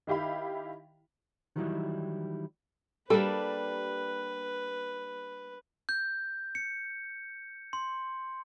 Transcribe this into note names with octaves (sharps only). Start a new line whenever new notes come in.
D#3 E4 G4 F5 B5
D#3 E3 F#3 G3 D#4 E4
G3 A#3 D4 G4 A4 B4
G6
C#7
C6